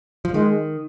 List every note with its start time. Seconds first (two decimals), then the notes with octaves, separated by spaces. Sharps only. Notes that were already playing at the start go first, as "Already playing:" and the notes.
0.25 F3
0.34 D#3 G#3